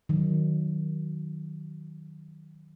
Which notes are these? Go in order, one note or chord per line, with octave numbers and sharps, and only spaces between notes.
D#3 F#3